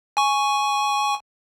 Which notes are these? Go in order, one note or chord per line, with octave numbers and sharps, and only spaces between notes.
G#5 C#6